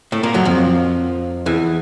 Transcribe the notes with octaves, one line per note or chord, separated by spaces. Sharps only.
A2 A3
A#2 A#3
F#2 F#3
F2 F3
E2 E3